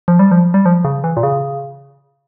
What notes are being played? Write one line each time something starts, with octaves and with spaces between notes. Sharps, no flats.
F3
G3
F3
G3
F3
C#3
E3
A#2
C#3